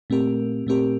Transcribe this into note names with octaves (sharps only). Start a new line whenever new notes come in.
A#2 A3 C4 G4 A#4
A#2 A3 C4 G4 A#4